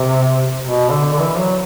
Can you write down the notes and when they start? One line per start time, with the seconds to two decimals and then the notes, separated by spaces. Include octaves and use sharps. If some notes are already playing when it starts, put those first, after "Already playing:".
Already playing: C3
0.63 B2
0.91 D3
1.13 D3
1.19 E3
1.38 F#3